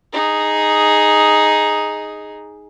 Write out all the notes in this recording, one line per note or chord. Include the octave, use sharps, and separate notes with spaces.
D#4 G#4